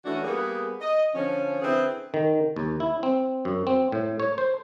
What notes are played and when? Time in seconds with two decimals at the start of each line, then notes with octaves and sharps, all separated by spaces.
0.06 E3 A3 C#4 D4 F#4
0.24 G3 A#3 B3 G#4
0.81 D#5
1.14 D3 F3 C#4
1.61 D3 C4 E4 G#4 B4
2.14 D#3
2.56 D#2
2.80 E4
3.03 C4
3.45 F#2
3.67 C4
3.92 A2
4.20 C#5
4.38 C5